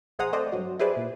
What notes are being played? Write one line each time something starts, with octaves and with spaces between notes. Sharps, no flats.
A#1 G#4 C5 F#5 A#5 D#6
A3 C4 C5 D5 D#5
G2 F#3 F#4
E4 G4 G#4 B4 C5 D5
A#2